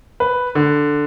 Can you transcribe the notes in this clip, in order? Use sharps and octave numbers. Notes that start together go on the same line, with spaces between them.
B4
D3